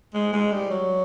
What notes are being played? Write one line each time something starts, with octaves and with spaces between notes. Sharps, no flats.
G#3
G#3
G3
F#3